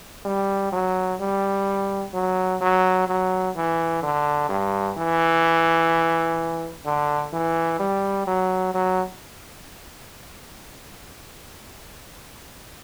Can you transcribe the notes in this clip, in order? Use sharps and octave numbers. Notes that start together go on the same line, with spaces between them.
G3
F#3
G3
F#3
F#3
F#3
E3
D3
G2
E3
D3
E3
G3
F#3
F#3